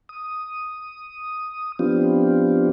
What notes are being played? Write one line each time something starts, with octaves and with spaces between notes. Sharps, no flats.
D#6
F3 B3 C4 D4 F4 G4